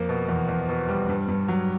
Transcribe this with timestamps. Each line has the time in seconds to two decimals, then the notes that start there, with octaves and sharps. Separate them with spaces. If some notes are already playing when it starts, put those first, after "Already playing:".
Already playing: F2 A#3
0.09 B2
0.29 E2
0.48 E2
0.68 B2
0.88 G3
1.09 G2
1.28 G2
1.48 F#3